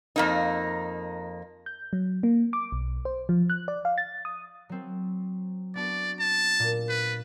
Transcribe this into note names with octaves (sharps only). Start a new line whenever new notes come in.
F2 A#3 D#4
G6
F#3
A#3
D6
B1
C5
F3
F#6
D5
F5
A6
D#6
F#3 C4
B3 D4 F#4 D5
A5
A#2
B4